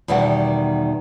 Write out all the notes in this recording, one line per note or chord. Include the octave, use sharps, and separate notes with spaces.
E2 B2 D#3 G3 G4 F#5